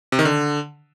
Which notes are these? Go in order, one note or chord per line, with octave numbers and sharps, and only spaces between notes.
C3
D#3
D3